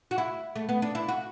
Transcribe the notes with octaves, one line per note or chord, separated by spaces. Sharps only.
F#4
E4
A3
B3
D4
E4
F#4